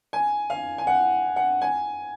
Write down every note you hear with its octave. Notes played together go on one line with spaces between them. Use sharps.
G#5
F5
G#5
F#5
F#5
G#5